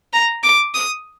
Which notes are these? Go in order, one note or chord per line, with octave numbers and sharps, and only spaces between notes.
A#5
D6
D#6